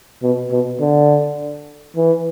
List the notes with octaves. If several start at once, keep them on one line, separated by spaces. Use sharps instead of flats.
B2
B2
D3
E3